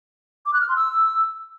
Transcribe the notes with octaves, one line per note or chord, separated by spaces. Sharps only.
D6
F#6
F6
C6
E6